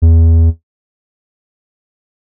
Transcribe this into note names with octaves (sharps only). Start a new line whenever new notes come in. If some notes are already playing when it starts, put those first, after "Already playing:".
E2